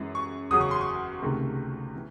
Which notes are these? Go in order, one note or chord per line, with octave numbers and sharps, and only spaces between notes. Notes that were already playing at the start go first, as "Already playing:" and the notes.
Already playing: F#2 E3 G#3
C#6
F#1 E2 C#3 F#3 D#6
C#6
C6
C#6
C#2 C3 D#3 A3
E3